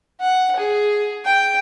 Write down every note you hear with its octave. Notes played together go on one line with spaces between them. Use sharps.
F#5
G#4
G5